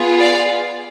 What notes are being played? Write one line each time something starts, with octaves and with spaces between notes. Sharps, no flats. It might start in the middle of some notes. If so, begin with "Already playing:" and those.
Already playing: B3 F4 G#4
D5 F5